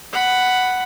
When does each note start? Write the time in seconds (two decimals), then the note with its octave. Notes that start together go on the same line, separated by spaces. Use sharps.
0.13 F#5 B5